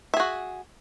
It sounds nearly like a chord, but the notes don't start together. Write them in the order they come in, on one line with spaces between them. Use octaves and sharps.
E5 G#4 F#4